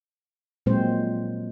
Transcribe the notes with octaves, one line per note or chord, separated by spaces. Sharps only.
A#2 F#3 G#3 C4 C5